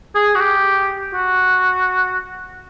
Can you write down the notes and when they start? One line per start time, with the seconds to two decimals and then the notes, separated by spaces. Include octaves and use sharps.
0.15 G#4
0.35 F#4
0.39 G4
1.14 F#4